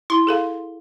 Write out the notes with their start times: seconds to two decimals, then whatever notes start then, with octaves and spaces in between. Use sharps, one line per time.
0.10 E4 C6
0.27 G#4 A4 F5